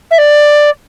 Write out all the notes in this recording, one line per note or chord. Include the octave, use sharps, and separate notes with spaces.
E5
D5